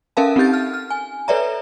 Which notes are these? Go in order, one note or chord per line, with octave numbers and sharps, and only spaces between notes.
C#4 A4 A#4 E5 F5 A5
C4 D#4 G4 G6 A6
F6
F6
G#5
A4 B4 C#5 D5 E5 A#5